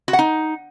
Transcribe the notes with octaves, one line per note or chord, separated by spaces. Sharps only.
F#4
F#5
D#4